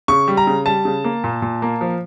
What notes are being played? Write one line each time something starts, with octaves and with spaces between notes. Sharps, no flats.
C#3 C#6
G3
A#5
C#3
G3 A5
C#3
A#3
A#2
A#2
A#3
F3